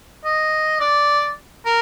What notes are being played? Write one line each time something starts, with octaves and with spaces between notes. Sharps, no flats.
D#5
D5
A#4